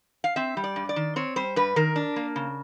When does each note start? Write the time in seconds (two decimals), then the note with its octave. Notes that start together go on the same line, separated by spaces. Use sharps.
0.24 F5
0.36 C4 E5
0.57 G3
0.64 D5
0.76 G2
0.89 D5
0.96 D#3
1.16 C4 C#5
1.36 G3 C5
1.56 G2 B4
1.76 D#3 A#4
1.96 D4
2.16 A#3
2.36 C#3